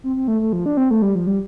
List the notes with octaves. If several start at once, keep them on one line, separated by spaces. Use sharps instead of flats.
C4
C4
A3
A3
F3
D4
C4
A3
G3
F3
G3